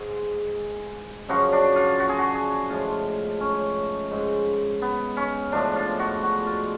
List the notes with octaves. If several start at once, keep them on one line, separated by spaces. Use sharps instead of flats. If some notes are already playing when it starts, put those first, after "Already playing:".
Already playing: G#2 G#3 G#4
F#2 C#3 F3 F#4
D4
F4
F#4
G#4
F#4
G#4
A2 F3 G#3 F4
C#4
G#2 G#3
B3
C#4
A2 F3 G#3 D4
F4
F#4
F#4
F4